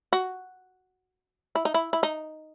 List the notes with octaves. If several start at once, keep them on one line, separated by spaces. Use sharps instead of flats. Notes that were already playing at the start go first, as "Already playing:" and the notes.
F#4
E4
D#4
E4
E4
D#4